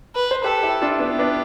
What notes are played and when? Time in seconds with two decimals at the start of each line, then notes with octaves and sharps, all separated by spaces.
0.15 B4
0.31 C5
0.44 G4 A4 B4
0.63 E4 G4
0.82 D4 F4
0.91 E4
1.00 B3 D4 G4
1.19 B3 D4